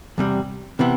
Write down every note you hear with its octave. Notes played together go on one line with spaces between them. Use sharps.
E2 C3 G3
C3 E3 B3 E4